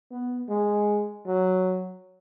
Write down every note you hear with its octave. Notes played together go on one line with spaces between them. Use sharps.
B3
G#3
F#3